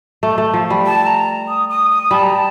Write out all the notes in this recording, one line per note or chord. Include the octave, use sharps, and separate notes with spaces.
A3
A3
F3
G3
A5
A#5
D#6
D#6
D#6
G3 A5
A#5
A5